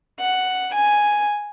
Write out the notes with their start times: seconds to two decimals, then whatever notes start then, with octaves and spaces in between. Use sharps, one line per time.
0.19 F#5
0.74 G#5